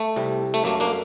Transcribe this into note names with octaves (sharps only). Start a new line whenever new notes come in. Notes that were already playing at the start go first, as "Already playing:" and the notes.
Already playing: A3
C2 C3 G3
A3
F#2 F#3 A3 A#3
A#3 D4